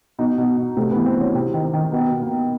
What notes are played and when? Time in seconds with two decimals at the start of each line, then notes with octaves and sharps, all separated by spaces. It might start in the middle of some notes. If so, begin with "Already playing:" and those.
0.19 B2 D#4
0.38 B2
0.57 B2
0.77 C3 A3
0.91 E3 B3
1.06 C4
1.16 E3
1.21 C#4
1.35 C3 C4
1.54 D#3
1.64 C4
1.73 D#3
1.92 B2 B3
2.12 B2
2.22 A#3
2.31 B2